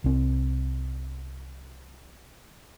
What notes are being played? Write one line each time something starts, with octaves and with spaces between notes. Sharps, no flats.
C2 C4